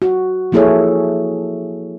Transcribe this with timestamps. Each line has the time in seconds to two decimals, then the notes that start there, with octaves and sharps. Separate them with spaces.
0.02 F#4
0.52 F3 A#3 E4 G#4 A4 C#5